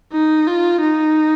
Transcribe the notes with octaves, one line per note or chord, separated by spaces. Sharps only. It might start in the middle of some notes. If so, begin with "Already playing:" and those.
D#4
F4
D#4